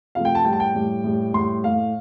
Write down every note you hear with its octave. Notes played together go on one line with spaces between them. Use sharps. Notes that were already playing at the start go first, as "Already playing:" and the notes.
C3 F3 A3 F5
G5
A5
A2 G3 G5
A5
G5
A2 G3
A2 G3
A2 G3 C6
A2 A3 F5